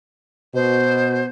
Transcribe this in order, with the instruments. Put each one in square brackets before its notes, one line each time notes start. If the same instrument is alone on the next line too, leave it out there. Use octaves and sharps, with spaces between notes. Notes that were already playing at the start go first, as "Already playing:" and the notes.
[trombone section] B2 [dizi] C5